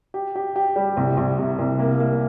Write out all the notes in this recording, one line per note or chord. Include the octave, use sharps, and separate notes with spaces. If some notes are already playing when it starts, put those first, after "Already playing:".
G4
G4
G4
G3
C2
C2
C3
C2
A#3
A#3